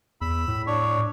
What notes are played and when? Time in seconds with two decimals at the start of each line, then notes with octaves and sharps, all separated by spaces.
0.21 E2 B5 E6
0.48 A2
0.67 D4 C#5